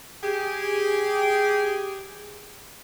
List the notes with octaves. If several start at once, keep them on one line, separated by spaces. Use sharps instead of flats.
G4 G#4